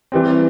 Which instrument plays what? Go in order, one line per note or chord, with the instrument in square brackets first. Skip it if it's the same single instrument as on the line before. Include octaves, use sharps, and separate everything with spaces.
[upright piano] E3 G3 C4